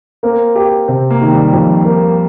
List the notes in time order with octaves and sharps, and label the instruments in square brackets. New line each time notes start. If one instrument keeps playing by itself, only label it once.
[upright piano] A#3 [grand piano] C4
[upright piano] G4
[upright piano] C3 [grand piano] C4
[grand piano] A#3
[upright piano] D#3
[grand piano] A#3
G3
[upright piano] F2
A#3